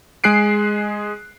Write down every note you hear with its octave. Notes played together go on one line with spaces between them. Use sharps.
G#3 G#4 F#6 C7 D7